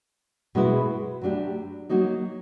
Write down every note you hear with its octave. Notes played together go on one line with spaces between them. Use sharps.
B2 G#3 B3 E4
F#3 A3 D4 G4
F#3 A#3 D#4 F#4